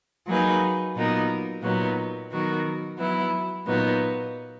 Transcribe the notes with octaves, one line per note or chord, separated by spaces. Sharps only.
F#3 A#3 D#4 G#4 B4
A#2 F#3 B3 D#4 A#4
A#2 F#3 B3 D#4
D#3 F#3 B3 F#4 A#4
F#3 B3 E4
A#2 F#3 B3 D#4